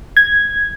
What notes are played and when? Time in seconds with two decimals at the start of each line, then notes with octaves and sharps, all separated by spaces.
0.17 G#6